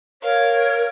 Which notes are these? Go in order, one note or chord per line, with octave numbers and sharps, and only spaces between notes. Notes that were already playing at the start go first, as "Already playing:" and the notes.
A#4 C#5 F5